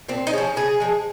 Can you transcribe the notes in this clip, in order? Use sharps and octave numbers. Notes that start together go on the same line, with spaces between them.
A#2 C4
D#4
F3 G#3 C#4
C#3 G#4
F3 G#3